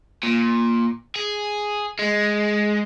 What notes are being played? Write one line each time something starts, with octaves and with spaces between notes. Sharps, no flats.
A#2
G#4
G#3